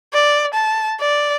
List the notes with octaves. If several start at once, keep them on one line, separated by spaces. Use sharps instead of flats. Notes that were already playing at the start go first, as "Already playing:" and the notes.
D5
A5
D5